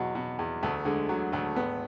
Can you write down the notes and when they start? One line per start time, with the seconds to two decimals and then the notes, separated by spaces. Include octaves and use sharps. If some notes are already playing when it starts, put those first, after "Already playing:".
Already playing: E2 B2 F#3
0.15 B2
0.39 E2
0.63 D2 A3
0.85 D3 G#3
1.09 D3 F#3
1.32 D2 A3
1.56 G#1 B3